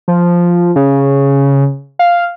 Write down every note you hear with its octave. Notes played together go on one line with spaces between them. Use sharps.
F3
C#3
F5